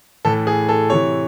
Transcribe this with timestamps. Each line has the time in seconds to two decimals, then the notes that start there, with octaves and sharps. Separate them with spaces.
0.25 A2 E3 A4
0.47 G#4
0.69 A4
0.90 C3 E3 C#5